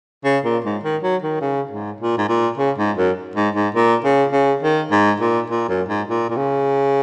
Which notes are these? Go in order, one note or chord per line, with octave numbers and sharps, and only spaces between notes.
C#3
A#2
G#2
D#3
F#3
D#3
C#3
G#2
A#2
G#2
A#2
C#3
G#2
F#2
G#2
G#2
A#2
C#3
C#3
D#3
G#2
A#2
A#2
F#2
G#2
A#2
A#2
C#3